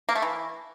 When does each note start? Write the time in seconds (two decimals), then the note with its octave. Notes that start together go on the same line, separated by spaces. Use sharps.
0.09 A#3
0.15 A3
0.22 E3